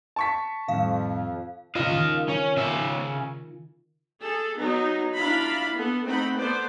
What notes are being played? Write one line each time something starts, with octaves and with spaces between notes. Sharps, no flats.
A5 C#6 B6
F2 A2 D#3 G3 F5
C#3 F4 D#5 F5
D#3
C#4
C#3 E5
G#4 A4
F#3 B3 D#4
D4 E4 F4 F5 A#5 B5
B3 A4
A3 C4 D#4 F#5 B5
B3 A4 C5 D5